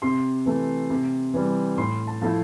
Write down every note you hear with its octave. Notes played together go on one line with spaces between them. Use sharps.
C3 C6
E3 A3
C3
E3 G3
A2 C6
A5
F3 A3 E4